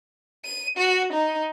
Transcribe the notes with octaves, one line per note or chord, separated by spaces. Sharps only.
D#7
F#4
D#4